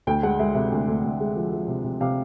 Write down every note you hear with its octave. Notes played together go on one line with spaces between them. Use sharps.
D2 G5
G#3 F#5
G#3 E5
C3 E5
D2
D2
D2
G#3
F3
F3
C3
C3
C3 F5